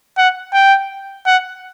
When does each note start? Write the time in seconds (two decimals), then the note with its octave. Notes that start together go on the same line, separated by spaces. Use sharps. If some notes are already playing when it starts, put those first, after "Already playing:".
0.18 F#5
0.53 G5
1.26 F#5